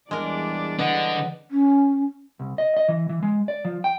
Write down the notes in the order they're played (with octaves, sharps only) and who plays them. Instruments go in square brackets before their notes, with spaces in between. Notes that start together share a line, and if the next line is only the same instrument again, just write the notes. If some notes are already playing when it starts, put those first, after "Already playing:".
[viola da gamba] E2 G3 D5 [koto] G#3 A#4 [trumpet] D4
[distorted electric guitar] D3 D4 [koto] B3 [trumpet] D#5
[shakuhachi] C#4
[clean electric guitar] C2
D#5
D#5
E3
E3
G#3
D5
F3
G5